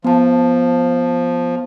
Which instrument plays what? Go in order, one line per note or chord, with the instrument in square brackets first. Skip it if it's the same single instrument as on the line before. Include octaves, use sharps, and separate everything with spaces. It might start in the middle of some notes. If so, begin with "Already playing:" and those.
[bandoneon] F3 [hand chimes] B3 A5